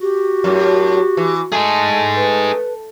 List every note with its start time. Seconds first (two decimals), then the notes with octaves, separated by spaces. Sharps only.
0.01 F#4 G4
0.44 F#2 A2
1.17 E3
1.52 A3 D#4 G#4
2.16 B4